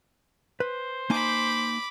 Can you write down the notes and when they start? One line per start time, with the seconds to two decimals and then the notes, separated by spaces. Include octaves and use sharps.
0.60 B4 C5
1.10 A#3 D#4 G#5 B5 D6